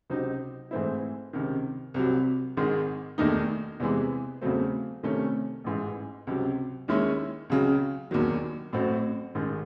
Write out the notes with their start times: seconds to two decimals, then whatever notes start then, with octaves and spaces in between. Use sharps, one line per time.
0.10 C#2 C3 F#3 C4 D#4
0.71 G#2 E3 A3 C4 E4
1.33 C#2 C3 D#3
1.94 C2 C3 F#3
2.57 G#1 G#2 D#3 G#3
3.18 E1 D#2 D#3 A3 D#4
3.80 E2 C3 E3 G#3
4.42 E2 C#3 F#3 A3 C4
5.03 C2 C3 D#3 A3 C#4
5.64 A1 G#2 E3
6.27 C#2 C3 F#3
6.88 D#2 D#3 G#3 C#4 E4
7.50 C#2 C#3 F#3
8.11 E1 D#2 D#3 F#3
8.73 A1 A2 F#3 C4 F#4
9.35 A1 G#2 D#3